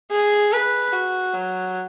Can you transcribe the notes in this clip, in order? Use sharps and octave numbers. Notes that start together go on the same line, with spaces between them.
G#4
B4
F#4
F#3